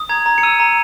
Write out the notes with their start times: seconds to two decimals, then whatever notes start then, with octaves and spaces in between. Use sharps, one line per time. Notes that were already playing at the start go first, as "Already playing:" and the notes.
Already playing: D#6
0.09 A#5 G#6
0.26 A#5
0.38 C#7
0.43 E6 D#7
0.60 A#5